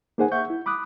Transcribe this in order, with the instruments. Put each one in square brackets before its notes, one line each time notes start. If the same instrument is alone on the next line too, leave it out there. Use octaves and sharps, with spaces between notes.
[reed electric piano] A#3 D#4 G#4 C5 F#5 G#5
E5 F#5 C#6 G6
E4
B5 D6 D#6 F#6